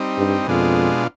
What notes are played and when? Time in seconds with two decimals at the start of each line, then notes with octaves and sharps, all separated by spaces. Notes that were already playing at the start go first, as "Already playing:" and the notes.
Already playing: G3 C4 D#4
0.17 G2
0.47 F2 B2 G#3 D4 F4